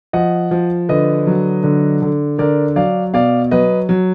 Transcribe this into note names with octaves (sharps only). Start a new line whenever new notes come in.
F3 D#5 F#5
F3
D3 B4 D#5
F#3
D3
D3
D3 A#4 D5
F#3 D5 F5
B2 D5 F5
F#3 B4 D#5
F#3